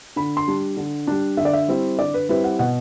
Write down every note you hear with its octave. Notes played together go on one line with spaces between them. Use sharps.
D3 B5
C6
G3 D4
D3
G3 D4
D3 E5
D5
E5
G3 C4 E4
D3 D5
B4
G3 C4 E4 B4
F#5
B2 F#5